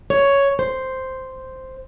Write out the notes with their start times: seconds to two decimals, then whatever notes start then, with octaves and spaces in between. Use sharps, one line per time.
0.10 C#5
0.59 C5